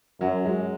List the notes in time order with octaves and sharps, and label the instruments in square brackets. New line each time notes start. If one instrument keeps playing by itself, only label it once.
[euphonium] F#2 [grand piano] F#3
[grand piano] G#3